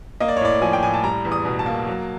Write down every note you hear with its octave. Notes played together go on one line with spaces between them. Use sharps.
A#3 D#5
D5
C#5
A2 D5
F3 G#5
G5
A2 G#5
A5
G3 A#5
E2
D#6
B2
A5
A#3
F#3